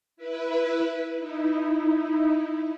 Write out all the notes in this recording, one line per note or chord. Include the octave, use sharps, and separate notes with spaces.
E4 B4
D#4 E4